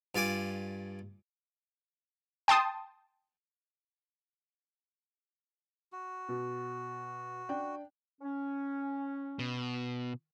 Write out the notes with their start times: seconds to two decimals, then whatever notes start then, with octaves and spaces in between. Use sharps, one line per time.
0.15 G2 F4 D5 G#5 D6
2.48 G5 A5 C6 D#6
5.93 F#4
6.28 B2
7.49 D4 G5
8.21 C#4
9.39 B2